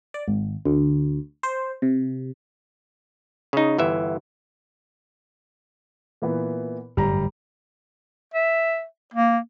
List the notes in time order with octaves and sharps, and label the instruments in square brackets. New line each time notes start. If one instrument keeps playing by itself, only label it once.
[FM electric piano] D5
G#1
D2
C5
C3
[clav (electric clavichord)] C#3 D#4
G1 E3 E5
[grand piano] A#2 E3 B3
[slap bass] G1 F#2 A2 [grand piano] G3 A#5
[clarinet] E5
A#3